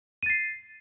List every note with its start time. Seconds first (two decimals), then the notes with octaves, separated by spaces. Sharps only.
0.23 D#7
0.26 A6
0.30 C7